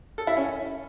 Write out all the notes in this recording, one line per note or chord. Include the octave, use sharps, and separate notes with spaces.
A4
E4
C#4